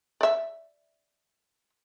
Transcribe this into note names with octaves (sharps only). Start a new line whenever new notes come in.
D5 E5